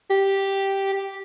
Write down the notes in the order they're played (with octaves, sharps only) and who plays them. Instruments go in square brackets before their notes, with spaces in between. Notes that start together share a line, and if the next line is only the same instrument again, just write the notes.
[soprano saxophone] G4
G4